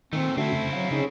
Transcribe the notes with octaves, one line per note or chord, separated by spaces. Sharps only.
A#2 D#3 A3 C4
D3 A3 C4 C#4 E4 F#4
F2 C#3
F#3 F5
C#3 C#4 D#4 G#4 C#5